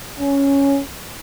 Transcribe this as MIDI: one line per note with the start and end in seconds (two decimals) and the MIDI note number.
0.19 0.80 61